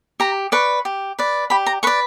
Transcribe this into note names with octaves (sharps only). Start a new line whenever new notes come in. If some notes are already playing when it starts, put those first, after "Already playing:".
G4 A#5
B4 D5 C#6
G4
B4 D5
G4 B5
A#5
B4 D5 C#6